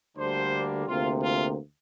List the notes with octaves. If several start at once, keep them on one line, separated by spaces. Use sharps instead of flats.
D2 D3 G3 A#3 D4 C5
D2 C3 A#3 F4
F4